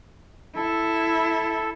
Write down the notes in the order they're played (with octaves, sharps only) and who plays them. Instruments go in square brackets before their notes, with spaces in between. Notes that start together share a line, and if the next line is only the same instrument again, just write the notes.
[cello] E4 [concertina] A4